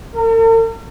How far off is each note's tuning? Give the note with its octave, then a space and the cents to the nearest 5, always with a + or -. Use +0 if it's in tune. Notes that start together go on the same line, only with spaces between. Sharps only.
A#4 -45